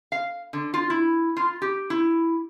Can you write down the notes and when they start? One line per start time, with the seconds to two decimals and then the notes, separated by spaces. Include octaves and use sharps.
0.12 F5
0.53 D3
0.74 F4
0.90 E4
1.37 F4
1.62 G4
1.90 E4